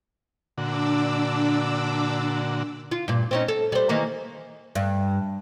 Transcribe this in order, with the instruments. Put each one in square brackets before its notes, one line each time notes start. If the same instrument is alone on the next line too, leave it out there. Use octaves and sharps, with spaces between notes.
[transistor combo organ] A#2 D3 F#4 [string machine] D4 D6 E6
[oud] F4
G2 A#2
C4 C#4 D#4
A4
G3 C5
D#3 E3 A#3
G2